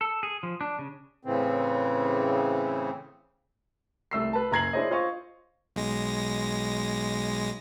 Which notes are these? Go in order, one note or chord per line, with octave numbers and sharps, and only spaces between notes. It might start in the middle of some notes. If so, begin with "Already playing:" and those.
A4
G#4
F3
D4
C#3
A2 C#3 E3 C4
C2 A3 E6 C7
B4 A5
F#1 A#5 G#6 C7 F#7
D4 E4 G#4 C5 C#5 D#5
F4 C5 D#5 F5 C#6
B1 G#3 A#6